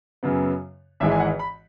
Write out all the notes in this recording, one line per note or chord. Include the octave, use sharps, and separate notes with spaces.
F#2 C#3 F#3 B3
G#1 G#2 E3 G#3 E5
G#5
F#5
B5